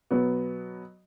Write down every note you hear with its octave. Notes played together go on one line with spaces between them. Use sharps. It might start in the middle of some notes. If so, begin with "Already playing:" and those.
B2 F#3 B3